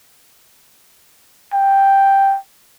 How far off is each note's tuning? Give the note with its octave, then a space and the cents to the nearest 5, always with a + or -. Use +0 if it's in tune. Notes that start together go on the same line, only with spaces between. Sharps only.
G5 +0